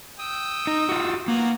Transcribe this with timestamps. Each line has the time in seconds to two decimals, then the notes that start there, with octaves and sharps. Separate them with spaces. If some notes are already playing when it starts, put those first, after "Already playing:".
0.19 G5 D#6 E6
0.67 D#4
0.89 F4 F#4
1.28 A#3 B3 F#4 A#5